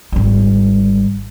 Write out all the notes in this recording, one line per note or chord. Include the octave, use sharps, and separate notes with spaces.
G#1 G3